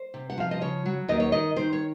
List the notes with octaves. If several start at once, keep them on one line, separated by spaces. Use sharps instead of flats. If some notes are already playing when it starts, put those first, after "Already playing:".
Already playing: C5
C3
F#5
F3 F5
D#5
C#3 C#5
F#3
D#2 D#5
C#5
D#3 D#5
D#3 C5
C#5